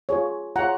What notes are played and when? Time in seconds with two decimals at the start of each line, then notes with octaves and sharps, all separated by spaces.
0.09 F4 G#4 C#5
0.56 F4 G#4 C#5 F#5 A#5